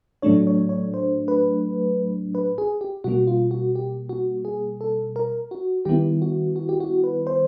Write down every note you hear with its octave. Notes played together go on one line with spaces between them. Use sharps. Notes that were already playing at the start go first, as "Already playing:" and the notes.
A2 F#3 A3 D4 C#5
C#5
C#5
C5
B4
B4
G#4
G4
B2 G3 A#3 F#4
F4
F#4
G4
F#4
G#4
A4
A#4
F#4
D#3 G3 B3 E4 G4
F#4
F#4
G4
F#4
B4
C5